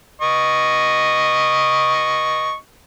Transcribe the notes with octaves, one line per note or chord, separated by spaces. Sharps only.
D#5 C#6